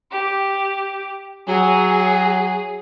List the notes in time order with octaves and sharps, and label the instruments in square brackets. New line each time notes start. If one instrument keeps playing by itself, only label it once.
[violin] G4
[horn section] F#3 [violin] G#4